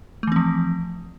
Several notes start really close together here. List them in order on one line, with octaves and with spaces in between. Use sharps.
A3 E3 C4 F3